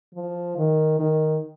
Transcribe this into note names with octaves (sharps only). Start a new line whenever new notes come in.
F3
D#3
D#3